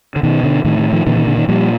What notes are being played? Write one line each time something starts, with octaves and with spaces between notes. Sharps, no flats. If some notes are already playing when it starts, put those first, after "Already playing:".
D3
B2 D#3
D3
A2 D#3
D#3
D#3 F3
A#2 D3 E3
D#3
D3
D#3
A#2 F3 G3